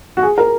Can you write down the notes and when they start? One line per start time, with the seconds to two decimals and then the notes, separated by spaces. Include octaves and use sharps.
0.17 F#4
0.23 G#4
0.38 A#4